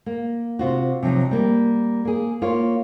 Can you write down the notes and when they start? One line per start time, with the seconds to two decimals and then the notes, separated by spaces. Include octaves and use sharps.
0.06 A#3
0.59 C3 F4 F#4
1.03 C3 F3 F#3 D#4
1.31 G3 A#3
2.05 A#3 G#4
2.42 A#3 F4 C#5